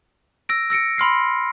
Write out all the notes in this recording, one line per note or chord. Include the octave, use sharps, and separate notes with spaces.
E6 A#6 D7
E6 A#6 C#7 D7
B5 C6 F6 C7